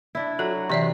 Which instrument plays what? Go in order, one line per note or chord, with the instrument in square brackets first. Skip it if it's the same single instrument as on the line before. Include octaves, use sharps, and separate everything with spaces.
[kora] D4 E4
[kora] F#3 [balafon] A4
[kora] C3 [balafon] E3 D5 E5